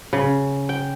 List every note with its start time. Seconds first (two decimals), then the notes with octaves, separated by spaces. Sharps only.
0.13 C#3
0.69 G5